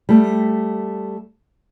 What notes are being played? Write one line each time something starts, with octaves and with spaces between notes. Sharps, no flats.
G3 A3